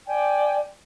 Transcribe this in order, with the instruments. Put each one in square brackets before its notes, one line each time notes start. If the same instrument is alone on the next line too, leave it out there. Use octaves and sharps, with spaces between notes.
[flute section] D5 G5 G#5